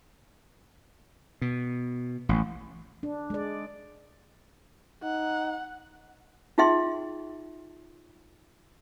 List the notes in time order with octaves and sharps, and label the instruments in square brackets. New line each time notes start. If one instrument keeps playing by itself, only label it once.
[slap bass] B2
A1
[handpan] D4
G#3 D5
[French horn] D#4 [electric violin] F#5
[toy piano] D#4 F4 G#4 E5 G5 C6